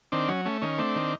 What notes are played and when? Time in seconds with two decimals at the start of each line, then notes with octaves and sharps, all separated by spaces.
0.12 D#3 C4 D4
0.28 F#3 C#4
0.45 A3 C#4
0.62 D#3 C#4
0.78 A3 C4 D4
0.96 D#3